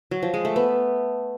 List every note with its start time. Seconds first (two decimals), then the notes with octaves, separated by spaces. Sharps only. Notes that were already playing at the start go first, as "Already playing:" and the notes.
0.11 F#3
0.22 F3
0.34 G#3
0.45 A3
0.56 B3